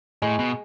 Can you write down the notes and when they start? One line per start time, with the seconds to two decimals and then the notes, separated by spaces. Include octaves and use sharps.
0.22 A2 G#3
0.39 B2